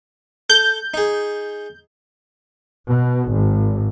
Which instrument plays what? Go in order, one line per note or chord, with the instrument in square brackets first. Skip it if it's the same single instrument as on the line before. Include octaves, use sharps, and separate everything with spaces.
[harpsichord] A4 [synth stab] G6
[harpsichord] D#4 G#4
[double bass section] B2
G#1